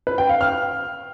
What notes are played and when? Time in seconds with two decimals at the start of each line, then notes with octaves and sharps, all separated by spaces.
0.07 B4
0.18 G5
0.29 F5
0.41 F6